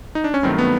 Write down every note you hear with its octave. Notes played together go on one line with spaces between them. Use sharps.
D#4
D4
C#4
G2 D#3 F#3 A3 C4
B3